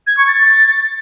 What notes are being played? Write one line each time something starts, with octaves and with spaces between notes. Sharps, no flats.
G#6
C#6
A6